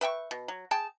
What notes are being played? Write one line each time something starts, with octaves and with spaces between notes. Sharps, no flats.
B4 E5 G5 C#6
B2
F#3
G#4 G5 A5